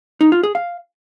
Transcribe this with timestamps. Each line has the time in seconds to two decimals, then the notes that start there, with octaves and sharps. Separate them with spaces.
0.21 D#4
0.32 F4
0.43 G#4
0.55 F5